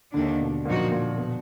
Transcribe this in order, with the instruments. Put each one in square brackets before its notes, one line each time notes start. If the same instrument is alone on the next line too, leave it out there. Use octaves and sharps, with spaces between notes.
[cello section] D#2 D#3 A#3 D4 [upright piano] D3
[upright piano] B2
[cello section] F#2 F3 A#3 D#4 F#4 [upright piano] A#2
[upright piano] A#2
B2